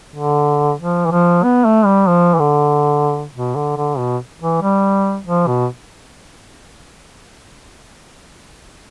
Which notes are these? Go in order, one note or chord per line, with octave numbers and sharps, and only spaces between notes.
D3
F3
E3
F3
B3
A3
G3
F3
E3
D3
B2
D3
D3
B2
E3
G3
F3
B2